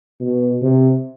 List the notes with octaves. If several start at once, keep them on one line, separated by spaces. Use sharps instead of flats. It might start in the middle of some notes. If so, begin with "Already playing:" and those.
B2
C3